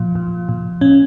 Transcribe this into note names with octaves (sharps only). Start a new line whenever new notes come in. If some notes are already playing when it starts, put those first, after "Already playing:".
Already playing: A#2 F3
A#2
A#2
A#2 C#4